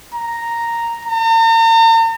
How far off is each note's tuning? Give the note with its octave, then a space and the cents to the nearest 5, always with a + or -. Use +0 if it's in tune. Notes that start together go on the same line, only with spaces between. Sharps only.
A#5 -5
A#5 -45